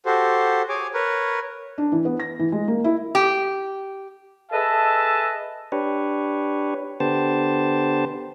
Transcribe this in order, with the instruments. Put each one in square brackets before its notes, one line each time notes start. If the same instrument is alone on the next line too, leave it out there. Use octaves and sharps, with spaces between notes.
[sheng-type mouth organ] F#4 G4 A4 C5
G#4 C#5 G#5 D6
A#4 B4 C#5
[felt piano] D4
E3
B3
A#6
E3
G#3
A#3
E4
[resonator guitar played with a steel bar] G4
[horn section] G#4 A4 B4 D#5 E5 A5
[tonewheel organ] D4 G4 B4 C#5
D3 B3 G4 C5 A5